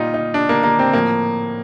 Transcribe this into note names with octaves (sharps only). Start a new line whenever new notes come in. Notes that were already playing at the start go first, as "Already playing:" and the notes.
Already playing: A#2 G3 D#4 F4
D#4
D4
A#3
A#3
C4
A2 F3 A#3